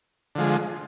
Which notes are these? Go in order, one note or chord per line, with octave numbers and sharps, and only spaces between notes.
D3 F3 G#3